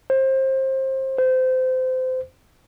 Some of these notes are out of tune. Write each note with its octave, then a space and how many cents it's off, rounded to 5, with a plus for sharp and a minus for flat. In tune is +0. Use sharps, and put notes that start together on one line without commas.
C5 +25
C5 -25